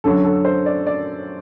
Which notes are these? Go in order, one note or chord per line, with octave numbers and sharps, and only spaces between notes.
F#2 D3 F#3 A4
A4
C5
D5
D5